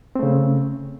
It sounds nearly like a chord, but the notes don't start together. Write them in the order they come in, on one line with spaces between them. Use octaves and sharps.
C4 A3 C#3